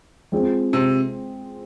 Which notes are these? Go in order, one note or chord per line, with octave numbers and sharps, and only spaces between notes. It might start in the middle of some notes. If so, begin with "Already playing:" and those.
G#3 C4 F4 G#4
C3